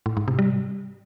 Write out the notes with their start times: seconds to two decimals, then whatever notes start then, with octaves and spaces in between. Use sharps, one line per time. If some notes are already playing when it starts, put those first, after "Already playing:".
0.06 A2
0.17 G#2
0.28 C3
0.39 G3